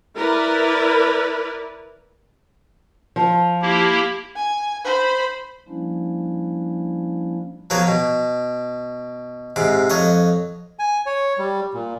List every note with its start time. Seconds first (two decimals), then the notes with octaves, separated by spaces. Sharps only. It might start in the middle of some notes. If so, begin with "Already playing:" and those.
0.17 E4 A#4 B4 D5
3.16 F3
3.62 A#3 E4 G4
4.36 G#5
4.85 C5 B5
5.68 F3 G3 A#3 C#4 D4 E4
7.70 F3 F#3 A#3 B3 C#5
7.87 B2
9.56 G#2 C3 D6
9.90 F2 C#5 D#5 F#5
10.79 G#5
11.06 C#5
11.38 G3
11.74 A#2